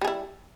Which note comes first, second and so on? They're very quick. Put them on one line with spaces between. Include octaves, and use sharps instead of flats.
G3 G#4 E4